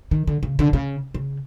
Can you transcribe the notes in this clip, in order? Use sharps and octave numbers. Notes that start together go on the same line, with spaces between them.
D#3
D3
C#3
D3
C#3
C#3